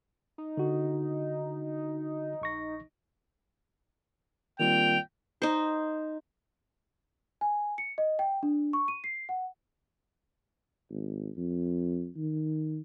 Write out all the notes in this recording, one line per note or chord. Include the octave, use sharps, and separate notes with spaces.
D#4
D3 F#4
A#1 C#6 A#6
A#2 D#3 G3 C4 G5 F7
D#4 C5
G#5
C#7
D#5
G5
D4
C#6
D#7
C7
F#5
G#1
F2
D#3